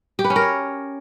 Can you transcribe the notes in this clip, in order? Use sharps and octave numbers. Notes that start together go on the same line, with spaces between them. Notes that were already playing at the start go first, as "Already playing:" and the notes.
G4
B4
C#4
A#4
C#5